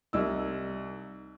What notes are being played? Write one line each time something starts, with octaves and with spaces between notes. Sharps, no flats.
C2 D#4 E6